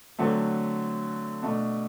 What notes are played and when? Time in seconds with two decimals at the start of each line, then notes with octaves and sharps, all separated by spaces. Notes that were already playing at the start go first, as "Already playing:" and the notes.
0.19 D3 F#3 A3 C4
1.43 B2 A3 D4